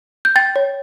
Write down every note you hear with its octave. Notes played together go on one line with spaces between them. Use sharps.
G6
G5 A6
C#5